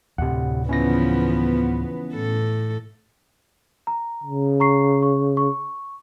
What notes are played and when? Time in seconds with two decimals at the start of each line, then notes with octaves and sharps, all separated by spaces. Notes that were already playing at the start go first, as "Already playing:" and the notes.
0.18 D2 A2 C3 F#5
0.69 C#3 E3 F3 B3 C#4 E4 A#6
2.14 A2 A4
3.87 A#5
4.24 C#3
4.60 A#5 C#6 C7
5.02 C#6
5.37 C#6